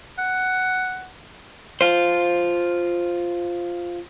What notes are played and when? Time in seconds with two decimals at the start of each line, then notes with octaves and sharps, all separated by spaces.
0.19 F#5
1.81 F4 C5